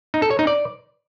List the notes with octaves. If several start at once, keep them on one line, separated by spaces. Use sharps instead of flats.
D#4
A4
C#5
D#4
D5